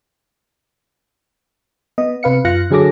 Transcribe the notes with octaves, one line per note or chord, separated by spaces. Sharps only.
B3 D#5
C3 B4 F5 C#7
F#2 F4 F5 F#6 A#6 C#7
D3 F#3 G#4 A4 D6 A#6